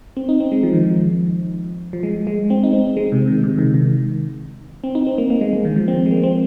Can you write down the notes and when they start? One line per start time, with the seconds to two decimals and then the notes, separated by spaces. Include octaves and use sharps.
0.17 C4
0.29 D#4
0.40 C4
0.52 G#3
0.63 F3
0.73 D#3
0.84 F3
1.93 F3
2.03 G#3
2.27 G#3
2.50 C4
2.63 D#4
2.73 C4
2.97 G#3
3.12 C3
3.28 D#3
3.44 C3
3.59 D#3
3.74 D#3
4.84 C4
4.95 D#4
5.07 C4
5.18 A#3
5.30 A#3
5.41 G#3
5.53 G#3
5.65 D#3
5.76 F3
5.88 C4
6.06 G#3
6.11 A#3
6.23 C4